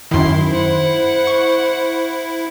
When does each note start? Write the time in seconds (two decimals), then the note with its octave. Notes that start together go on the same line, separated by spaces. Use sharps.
0.11 F#2 D#3 E4 C6
0.49 C5 F#5
1.27 C#6